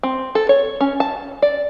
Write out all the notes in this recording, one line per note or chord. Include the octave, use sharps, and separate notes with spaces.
C4
A4
C#5
C#4
A5
D5